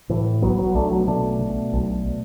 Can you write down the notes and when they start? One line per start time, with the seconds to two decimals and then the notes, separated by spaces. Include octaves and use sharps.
0.09 A2 E3
0.42 B1 F#3 B3
0.59 F#3 B3
0.75 B1 A3 D4
0.91 F#3 B3
1.07 B2 A3 D4
1.41 B2
1.73 B1